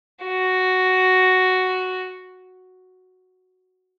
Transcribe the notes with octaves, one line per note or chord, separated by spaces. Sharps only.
F#4